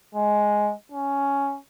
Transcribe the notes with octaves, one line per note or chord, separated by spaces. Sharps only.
G#3
C#4